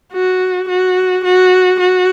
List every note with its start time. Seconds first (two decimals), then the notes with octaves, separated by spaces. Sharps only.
0.13 F#4
0.69 F#4
1.25 F#4
1.80 F#4